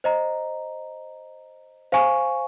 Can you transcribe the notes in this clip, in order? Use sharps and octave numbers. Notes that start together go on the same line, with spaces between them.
C5 D#5 A#5
C5 F5 G#5 C#6